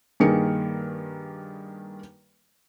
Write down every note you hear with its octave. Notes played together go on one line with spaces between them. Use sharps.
G2 D#3 A#3 G#4 A#4 C#7